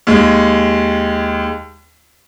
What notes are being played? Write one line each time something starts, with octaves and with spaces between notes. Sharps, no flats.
D#2 G#3